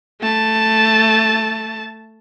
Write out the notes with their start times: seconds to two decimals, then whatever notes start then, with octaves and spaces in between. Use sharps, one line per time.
0.21 A3 A5